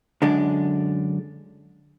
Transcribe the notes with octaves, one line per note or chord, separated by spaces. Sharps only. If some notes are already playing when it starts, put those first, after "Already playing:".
F#2 D3 G#3 D4